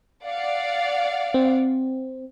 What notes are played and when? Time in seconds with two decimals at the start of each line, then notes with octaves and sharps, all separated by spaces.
0.24 D5 F5 F#5
1.34 C4